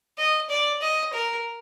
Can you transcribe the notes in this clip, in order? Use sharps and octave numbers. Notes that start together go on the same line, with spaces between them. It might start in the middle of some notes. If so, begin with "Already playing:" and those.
D#5
D5
D#5
A#4